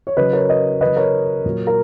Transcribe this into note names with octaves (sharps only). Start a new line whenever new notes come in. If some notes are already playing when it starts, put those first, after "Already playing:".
C#5
C#3 F#3 B4 D#5
A#4 C#5
B4 D#5
C#3 F#3 B4 D#5
A#4 C#5
A#2 F#3
A#4